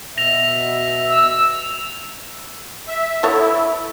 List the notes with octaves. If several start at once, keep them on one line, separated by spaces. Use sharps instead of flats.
B2 E5 A#6 F7
E6
E5
B3 E4 A4 C#5 E5